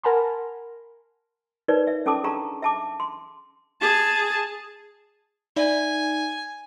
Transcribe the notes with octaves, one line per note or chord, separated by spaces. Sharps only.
A#4 F#5 G#5 A5 B5 C6
D#4 A#4 B4 C#5 D5
E5
C#4 A4 A5 D6 D#6
D4 G#4 F5 A5 A#5 C#6
E5 A5 D6
C6
G#4 A5
D#4 D5 E5 G#5